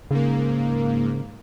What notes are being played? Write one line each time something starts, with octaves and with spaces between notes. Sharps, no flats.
G#2 C#3 A#3